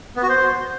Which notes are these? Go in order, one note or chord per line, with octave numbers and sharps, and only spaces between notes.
B3
F#4
C5